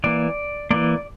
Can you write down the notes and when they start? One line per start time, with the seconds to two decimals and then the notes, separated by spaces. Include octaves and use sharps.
0.04 E3 A#3 D5
0.71 E3 A#3 D5